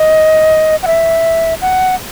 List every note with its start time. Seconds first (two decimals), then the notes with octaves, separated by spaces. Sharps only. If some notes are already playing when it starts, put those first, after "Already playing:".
Already playing: D#5
0.83 F#5
0.87 E5
1.62 F#5